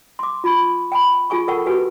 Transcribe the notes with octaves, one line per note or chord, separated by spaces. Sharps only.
C6 D6
F4 B5 C#6
G5 G#5 B5
F4 G#4 G#5 C#6
A4 A#4 F#5 G5 A5 C#6
F#4 G4 B4 G#5